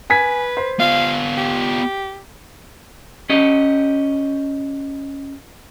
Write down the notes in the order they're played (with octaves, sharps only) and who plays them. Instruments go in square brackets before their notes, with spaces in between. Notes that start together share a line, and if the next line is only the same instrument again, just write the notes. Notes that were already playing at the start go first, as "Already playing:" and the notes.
[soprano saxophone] B4 [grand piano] G#5 G#6 B6
[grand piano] C5
[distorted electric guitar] B3 F4 [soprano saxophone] F5
[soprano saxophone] G4
[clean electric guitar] C#4 G4 D#5